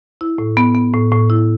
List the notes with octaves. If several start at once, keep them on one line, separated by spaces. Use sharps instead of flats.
E4
A2
B3
B3
A2
A2
E4